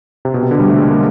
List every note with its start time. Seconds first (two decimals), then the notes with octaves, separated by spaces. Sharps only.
0.25 C3
0.34 B2
0.43 C3
0.51 D3
0.60 G3
0.68 A3
0.78 G#3
0.90 A#3